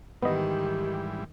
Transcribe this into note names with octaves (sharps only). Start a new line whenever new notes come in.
G#2 D#3 E3 G3 B3 G4 D#5